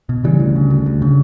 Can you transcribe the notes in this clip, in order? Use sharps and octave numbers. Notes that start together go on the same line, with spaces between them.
B2
C#3 E3 G3
D2
C#3
D2
D2
C#3